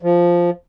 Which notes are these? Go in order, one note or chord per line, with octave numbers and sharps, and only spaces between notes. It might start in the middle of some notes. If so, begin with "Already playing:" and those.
F3